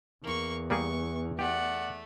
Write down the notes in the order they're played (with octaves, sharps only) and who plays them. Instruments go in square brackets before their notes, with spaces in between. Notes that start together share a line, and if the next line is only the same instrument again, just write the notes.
[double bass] E2 [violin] A#3 C#6
[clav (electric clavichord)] G3 A#3 G#4 [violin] C#6
[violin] A3 [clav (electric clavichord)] G4 [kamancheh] D5 F#5